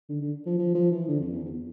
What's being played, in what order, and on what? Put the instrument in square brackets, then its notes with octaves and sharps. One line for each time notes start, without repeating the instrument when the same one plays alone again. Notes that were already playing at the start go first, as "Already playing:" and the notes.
[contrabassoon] D3
D3
F3
F3
F3
E3
D3
F2
E2
E2